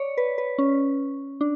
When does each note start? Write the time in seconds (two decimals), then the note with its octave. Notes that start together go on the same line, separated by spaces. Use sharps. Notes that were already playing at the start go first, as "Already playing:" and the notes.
Already playing: C#5 D5
0.17 B4
0.38 B4
0.58 C#4
1.41 D4